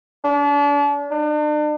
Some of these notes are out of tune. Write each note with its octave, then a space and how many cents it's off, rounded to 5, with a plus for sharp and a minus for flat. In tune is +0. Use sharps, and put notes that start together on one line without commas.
D4 -35
D4 +40